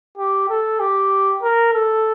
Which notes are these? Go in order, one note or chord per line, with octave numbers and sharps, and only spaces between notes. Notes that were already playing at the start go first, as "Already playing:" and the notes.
G4
A4
G4
A#4
A4